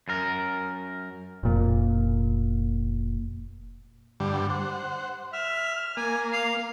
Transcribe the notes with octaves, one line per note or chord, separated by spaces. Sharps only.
F#2 A#4
F1 A#2
G2 D3 G3
C5 F#5
E5 F6
A#3 G#5
F5